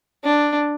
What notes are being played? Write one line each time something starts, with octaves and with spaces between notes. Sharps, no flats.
D4